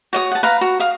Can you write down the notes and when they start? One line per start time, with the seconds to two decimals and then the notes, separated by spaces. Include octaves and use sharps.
0.13 F#4 C#5 D#6
0.32 F#5 A5
0.43 B4 F5 A#5
0.61 F#4
0.80 F5 D#6